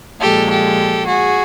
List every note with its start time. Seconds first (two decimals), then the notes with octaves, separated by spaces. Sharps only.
0.21 A#2 F3 G#3 G4 A4
0.50 G4 A4
1.06 F#4 G#4